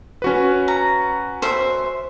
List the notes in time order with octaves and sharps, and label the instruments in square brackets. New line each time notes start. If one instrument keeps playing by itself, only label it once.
[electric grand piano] C#4 F#4 B4
[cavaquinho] A#5
C5 E5